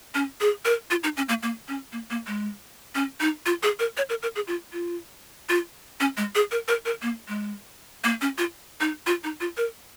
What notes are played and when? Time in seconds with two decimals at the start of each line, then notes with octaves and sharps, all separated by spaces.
0.15 C#4
0.41 G#4
0.65 A#4
0.91 F4
1.04 D#4
1.17 C#4
1.29 A#3
1.43 A#3
1.68 C#4
1.92 A#3
2.10 A#3
2.27 G#3
2.95 C#4
3.20 D#4
3.46 F4
3.63 G#4
3.79 A#4
3.97 C#5
4.09 A#4
4.23 A#4
4.36 G#4
4.47 F4
4.73 F4
5.49 F4
6.00 C#4
6.17 G#3
6.35 G#4
6.51 A#4
6.68 A#4
6.85 A#4
7.02 A#3
7.28 G#3
8.04 A#3
8.21 C#4
8.38 F4
8.81 D#4
9.07 F4
9.24 D#4
9.41 F4
9.57 A#4